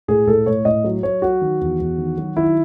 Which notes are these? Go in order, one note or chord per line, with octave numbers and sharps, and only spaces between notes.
A2 G#4
A2 A4
A2 C#5
A2 D#5
F#3
F#3 C#5
F#3 F#4
D#3
E2
E2
D#3
F#3
D#3 E4